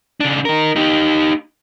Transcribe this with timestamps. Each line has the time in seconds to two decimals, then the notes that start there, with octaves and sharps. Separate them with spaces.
0.20 C#3 D4
0.45 D#4 A#4
0.76 D#4 G4